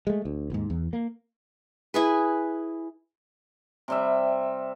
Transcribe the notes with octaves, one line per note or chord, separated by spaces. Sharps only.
G#3 A3
D2
A1 D#2 G#2
E2
A#3
E4 G#4 B4
C3 G3 E5